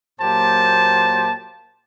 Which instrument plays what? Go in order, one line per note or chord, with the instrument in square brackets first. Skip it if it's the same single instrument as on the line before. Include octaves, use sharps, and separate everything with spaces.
[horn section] A#2 F#3 A#3 G4 C5 A5